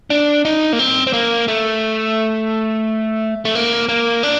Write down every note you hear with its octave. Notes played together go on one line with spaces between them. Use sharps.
D4
D#4
A#3
C4
C4
A#3
A3
A3
A#3
A#3
D4